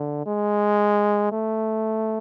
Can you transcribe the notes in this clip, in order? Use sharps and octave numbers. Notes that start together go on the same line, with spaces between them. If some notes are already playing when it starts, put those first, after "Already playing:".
Already playing: D3
G#3
A3